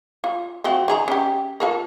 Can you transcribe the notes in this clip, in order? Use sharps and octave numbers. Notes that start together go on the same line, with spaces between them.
F4
F3 C4 F#4
D#3 G#4 A#5
C#4 G4
F4 A4 A#4